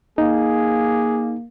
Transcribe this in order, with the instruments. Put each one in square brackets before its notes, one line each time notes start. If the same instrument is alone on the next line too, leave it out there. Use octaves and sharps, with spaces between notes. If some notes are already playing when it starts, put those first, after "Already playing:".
[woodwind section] A#3 [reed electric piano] D#4 [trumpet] G#4